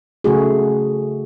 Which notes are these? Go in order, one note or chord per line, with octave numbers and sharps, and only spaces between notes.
C#3 A3 F#4 G#4